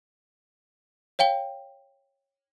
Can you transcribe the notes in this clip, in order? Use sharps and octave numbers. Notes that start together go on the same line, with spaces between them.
C#5 F5 G5 G7